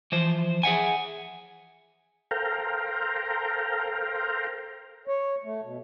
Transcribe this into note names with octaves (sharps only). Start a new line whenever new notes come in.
E3 F3 C5
G#4 E5 F#5 G#5
A4 A#4 C5 F5 G5 A#5
C#5
A3
B2